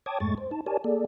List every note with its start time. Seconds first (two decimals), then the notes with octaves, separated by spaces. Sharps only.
0.06 C#5 G5 A5 D6 D#6 G#6
0.20 F2 G#2 G#3 A3 C#6 A6
0.38 C5
0.51 D#4 A5
0.66 G4 A#4 C#5 D5 G#5 A5
0.84 A#3 G#4 A4 D5